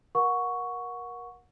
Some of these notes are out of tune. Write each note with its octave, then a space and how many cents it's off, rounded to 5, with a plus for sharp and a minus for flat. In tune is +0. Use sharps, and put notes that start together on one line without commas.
A#4 +25 F#5 -25 C#6 +5